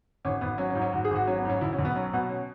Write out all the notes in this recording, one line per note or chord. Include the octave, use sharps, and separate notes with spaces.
G#1 C#4
G#1 B3
F#3 C#4
C#4
G#2
C#4
G#1 F#4
G#4
G#1 F#4
F#3 C#4
B3
G#2 C#4
B1 E4
C#4
B1
B3
F#3 C#4
B2 B3
C#4